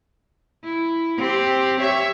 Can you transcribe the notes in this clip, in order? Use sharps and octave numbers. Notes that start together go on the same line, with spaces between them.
E4
C4 G4
C#5 E5